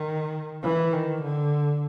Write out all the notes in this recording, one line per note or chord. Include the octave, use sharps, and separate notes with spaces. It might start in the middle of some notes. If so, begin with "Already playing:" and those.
Already playing: D#3
E3
D#3
D3